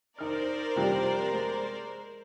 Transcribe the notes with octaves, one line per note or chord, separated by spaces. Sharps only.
D#4 A#4 C5 D5 F6
C3 F3 G3
G#3